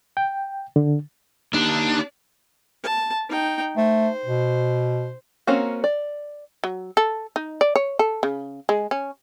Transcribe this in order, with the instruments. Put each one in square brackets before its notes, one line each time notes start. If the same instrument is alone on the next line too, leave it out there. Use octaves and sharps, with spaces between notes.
[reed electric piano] G5
D3
[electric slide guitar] A#3 D#4 G4 [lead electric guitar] D4
[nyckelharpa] A5
D#4 G5
[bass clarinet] A3 [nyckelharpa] C5
[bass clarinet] B2
[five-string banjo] A#3 C4 C#4 F#4 A#4
D5
[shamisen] F#3
A4
D#4
D5
C#5
A4
C#3
G#3
C#4